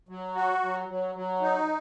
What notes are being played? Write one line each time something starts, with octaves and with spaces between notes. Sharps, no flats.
F#3
F#4
F#3
F#3
F#3
D#4